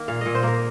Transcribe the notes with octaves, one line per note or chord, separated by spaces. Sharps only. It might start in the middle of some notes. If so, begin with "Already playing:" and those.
Already playing: D#3 A#3
A#2 F5
A#2 D#5
C5
A#3 A#4